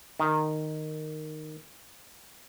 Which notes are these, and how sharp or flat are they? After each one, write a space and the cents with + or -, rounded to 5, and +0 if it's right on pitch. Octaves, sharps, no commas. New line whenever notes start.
D#3 -10